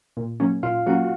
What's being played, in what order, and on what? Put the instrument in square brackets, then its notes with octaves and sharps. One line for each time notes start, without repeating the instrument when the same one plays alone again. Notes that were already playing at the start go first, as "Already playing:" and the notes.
[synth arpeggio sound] A#2
F#3 A#3 C#4
[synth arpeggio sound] A#2 [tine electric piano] F4 F5
[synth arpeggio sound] F#3 A#3 C#4 [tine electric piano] F#4 F#5